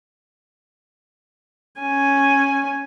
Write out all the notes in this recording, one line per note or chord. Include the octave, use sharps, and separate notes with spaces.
C#4 G#5